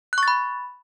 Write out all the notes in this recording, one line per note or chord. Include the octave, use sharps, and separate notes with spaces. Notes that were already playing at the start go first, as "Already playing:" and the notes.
B5 C#6 F#6 A6